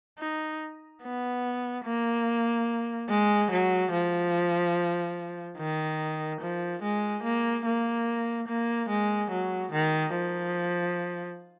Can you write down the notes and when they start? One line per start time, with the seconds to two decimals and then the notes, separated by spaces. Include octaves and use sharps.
0.19 D#4
1.03 B3
1.85 A#3
3.10 G#3
3.51 F#3
3.92 F3
5.58 D#3
6.41 F3
6.82 G#3
7.23 A#3
7.65 A#3
8.48 A#3
8.89 G#3
9.31 F#3
9.72 D#3
10.14 F3